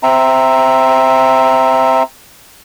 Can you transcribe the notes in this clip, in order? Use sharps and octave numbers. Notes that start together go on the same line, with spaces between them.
C4 E5 A#5